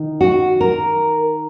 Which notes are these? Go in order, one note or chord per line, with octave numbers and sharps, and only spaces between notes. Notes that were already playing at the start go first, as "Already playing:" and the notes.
Already playing: D#3 D#4
F#4
A#4